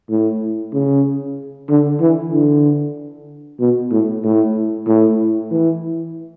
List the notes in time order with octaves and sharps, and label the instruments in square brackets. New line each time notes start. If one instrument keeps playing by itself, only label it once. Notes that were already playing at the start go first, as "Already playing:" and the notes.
[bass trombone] A2
C#3
D3
E3
D3
B2
A2
A2
A2
E3